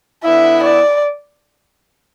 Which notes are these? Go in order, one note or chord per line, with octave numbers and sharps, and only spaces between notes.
D3 B3 E4 E5
D5